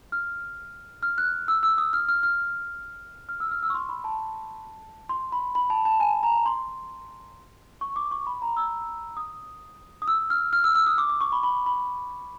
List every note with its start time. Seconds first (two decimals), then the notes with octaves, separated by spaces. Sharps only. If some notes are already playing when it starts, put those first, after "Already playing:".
0.12 F6
1.03 F6
1.18 F#6
1.48 E6
1.63 E6
1.78 D#6
1.93 F6
2.08 F6
2.23 F6
3.29 F6
3.40 E6
3.51 F6
3.63 E6
3.70 C#6
3.74 C6
3.89 B5
4.04 A5
5.09 C6
5.32 B5
5.55 B5
5.70 A5
5.85 A5
6.00 G#5
6.23 A#5
6.46 C6
7.81 C#6
7.96 D6
8.11 C#6
8.27 B5
8.42 A#5
8.57 E6
9.17 D#6
10.02 D#6
10.08 E6
10.30 F6
10.53 F6
10.64 E6
10.75 E6
10.87 D#6
10.98 D6
11.09 D6
11.21 C#6
11.32 B5
11.43 B5
11.66 B5